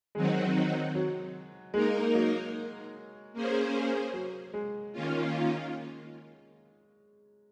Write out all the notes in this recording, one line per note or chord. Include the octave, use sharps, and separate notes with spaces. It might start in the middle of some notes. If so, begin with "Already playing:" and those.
D#3 F#3 G#3 C4 D#4 F#4
F#3
G#3 A#3 D#4 A#4
F#3
A#3 C#4 G#4 C5
F#3
G#3
D#3 A#3 C#4 F4